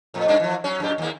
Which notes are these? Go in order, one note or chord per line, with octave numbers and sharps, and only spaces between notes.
F2 A2
G2 A#3 D4
E3 F3
F#3 C#4
F#2 A#2 G4
D#2 A#3